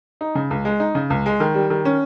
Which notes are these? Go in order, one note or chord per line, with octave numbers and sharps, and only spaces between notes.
D#4
C#3
C#2
G#3
D#4
C#3
C#2
G#3
D#3
G3
D#3
C#4